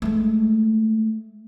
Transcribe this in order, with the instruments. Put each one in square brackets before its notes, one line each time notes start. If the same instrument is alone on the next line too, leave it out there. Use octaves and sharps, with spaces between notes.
[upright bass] G#3 A3